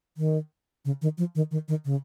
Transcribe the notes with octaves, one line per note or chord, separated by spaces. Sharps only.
D#3
C#3
D#3
F3
D#3
D#3
D#3
C#3